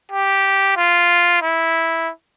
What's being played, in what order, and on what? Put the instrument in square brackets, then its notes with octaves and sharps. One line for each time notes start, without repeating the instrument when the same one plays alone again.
[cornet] G4
F4
E4